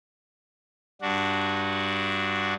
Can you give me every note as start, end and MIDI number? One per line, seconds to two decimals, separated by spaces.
1.01 2.54 43
1.01 2.54 62
1.01 2.54 66